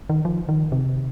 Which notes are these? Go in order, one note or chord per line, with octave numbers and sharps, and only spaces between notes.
D#3
F3
D#3
C3